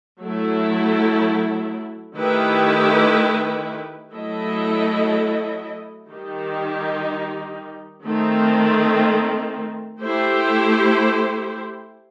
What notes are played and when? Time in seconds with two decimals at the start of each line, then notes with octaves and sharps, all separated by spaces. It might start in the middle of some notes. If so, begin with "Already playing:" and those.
0.20 F#3 A3 E4
2.17 D#3 A3 E4 G4 B4
4.13 F#3 A3 E4 A4 D#5
6.10 D#3 G3 D#4 G4
8.06 D#3 A3 C4
10.02 A3 E4 G4 C5